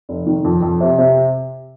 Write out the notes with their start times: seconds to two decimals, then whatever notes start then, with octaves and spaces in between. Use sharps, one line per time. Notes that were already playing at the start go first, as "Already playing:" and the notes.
0.09 F1
0.26 D#3
0.45 F2
0.62 F2
0.81 C3
0.98 C3